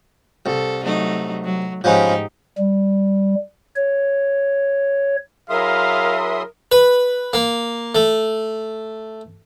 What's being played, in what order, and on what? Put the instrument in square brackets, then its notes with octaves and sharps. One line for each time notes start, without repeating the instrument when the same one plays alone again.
[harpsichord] C2 [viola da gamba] A4
[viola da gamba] F#3 A3 D#4
F#3
[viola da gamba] G#2 D#4 G4 [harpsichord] F3 B3 C#4
[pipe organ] G3
C#5
[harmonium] F#3 E4 G#4 [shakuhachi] A#4 [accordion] E5 C6 D#6 [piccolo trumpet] F5
[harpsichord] B4
A#3
A3